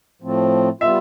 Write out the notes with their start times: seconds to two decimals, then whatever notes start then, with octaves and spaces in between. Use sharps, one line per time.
0.22 A2 F3 A3 C4
0.81 G3 B3 F4 E5